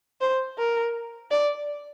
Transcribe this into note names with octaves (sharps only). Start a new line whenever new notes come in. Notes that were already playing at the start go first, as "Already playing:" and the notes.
C5
A#4
D5